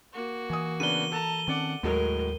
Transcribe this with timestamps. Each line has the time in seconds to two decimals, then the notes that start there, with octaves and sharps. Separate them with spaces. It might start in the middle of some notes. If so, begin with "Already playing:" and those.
0.13 A#3 F#4
0.50 E3 G#5 D#6
0.80 C#3 B3 D4 D#7 G7
1.12 A4 A5 A#5
1.48 D#3 C4 C#4 D5 F#5
1.83 D#2 A2 F#3 G#3 A#4